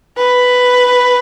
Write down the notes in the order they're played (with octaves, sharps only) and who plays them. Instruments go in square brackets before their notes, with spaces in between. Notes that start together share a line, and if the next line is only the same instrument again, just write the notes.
[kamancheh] B4